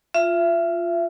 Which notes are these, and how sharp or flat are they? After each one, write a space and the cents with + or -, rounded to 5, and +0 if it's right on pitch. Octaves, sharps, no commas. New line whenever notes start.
F4 +0 E5 +30